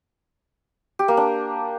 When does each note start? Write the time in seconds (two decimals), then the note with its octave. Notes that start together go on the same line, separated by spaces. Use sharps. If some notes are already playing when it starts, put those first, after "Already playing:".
0.99 G4
1.08 A#3
1.17 D4